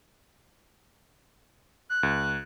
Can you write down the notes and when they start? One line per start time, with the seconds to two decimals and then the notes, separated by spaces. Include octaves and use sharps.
1.90 F#6
2.03 C#2